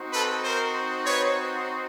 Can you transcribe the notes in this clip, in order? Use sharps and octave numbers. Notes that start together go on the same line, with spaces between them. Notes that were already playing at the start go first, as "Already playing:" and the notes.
Already playing: C4 D#4 F#4
A4 B4
A#4 C5
B4 C#5